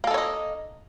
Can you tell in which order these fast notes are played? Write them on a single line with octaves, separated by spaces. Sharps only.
A#3 A4 D#4 C#5 D#5